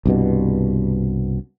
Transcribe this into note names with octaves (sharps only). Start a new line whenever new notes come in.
C2 G2 B2